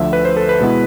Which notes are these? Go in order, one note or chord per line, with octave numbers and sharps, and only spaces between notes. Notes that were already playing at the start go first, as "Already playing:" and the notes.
Already playing: D2 D3 F3 E5
B4
C5
A4
B4
B2 G#3 B3 E4